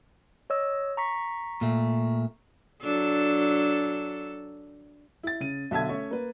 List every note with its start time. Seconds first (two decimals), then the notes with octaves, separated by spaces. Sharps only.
0.50 C#5 D#5 E6
0.97 A#5 C#6 B6
1.61 A#2 A3
2.83 F#3 D4 A4
5.23 E4 A6
5.40 C#3 D#7
5.71 B1 D3 E5 A5 G#6
5.89 A3 C#4 C#5 E5
6.11 A#3 B4